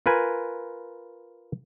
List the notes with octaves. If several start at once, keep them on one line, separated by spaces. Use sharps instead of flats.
F4 A#4 B4 G#5